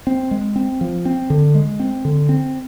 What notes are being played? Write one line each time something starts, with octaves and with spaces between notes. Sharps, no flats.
C4
G#3
C4
F3
C4
D3
G#3
C4
D3
C4